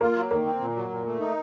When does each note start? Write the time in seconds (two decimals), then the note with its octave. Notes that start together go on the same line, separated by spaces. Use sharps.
0.01 A#3 F4
0.16 F#3
0.31 D#3 A#3
0.46 C4
0.61 A#2
0.75 F#3
0.90 A#2
1.06 A3
1.20 D#4